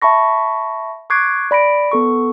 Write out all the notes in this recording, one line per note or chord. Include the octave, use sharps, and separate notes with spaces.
E5 A5 B5 C#6 A#6
C#6 D6 F#6 G#6 C7 D7
D5 B5 A#6 D7
B3 A4 C#6